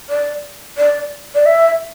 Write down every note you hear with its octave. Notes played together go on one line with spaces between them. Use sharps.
D5
D5
D5
E5